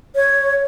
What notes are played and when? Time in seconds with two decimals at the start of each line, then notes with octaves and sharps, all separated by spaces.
0.15 C#5